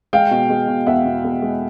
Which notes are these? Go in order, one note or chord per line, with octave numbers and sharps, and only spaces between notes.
G#3 F5 G5
B2
G#3
B2
E2 E5 F#5
B2
E2
G#3